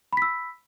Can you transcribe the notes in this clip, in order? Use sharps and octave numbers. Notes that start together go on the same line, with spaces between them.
B5 E6 B6